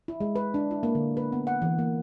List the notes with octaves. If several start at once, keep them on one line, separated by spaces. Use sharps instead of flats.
E4
G#3
B4
D4
E4
A#3
D3
B4
B3
F#5
E3
A#3